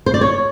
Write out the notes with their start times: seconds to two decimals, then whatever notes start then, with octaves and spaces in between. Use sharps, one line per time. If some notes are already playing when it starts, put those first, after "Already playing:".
0.06 C5
0.14 D5
0.21 C#5